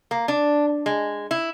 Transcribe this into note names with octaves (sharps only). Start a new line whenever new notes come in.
A#3
D4
G#3
E4